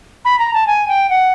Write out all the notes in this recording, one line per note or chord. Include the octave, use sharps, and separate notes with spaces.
B5
A#5
A5
G#5
G5
F#5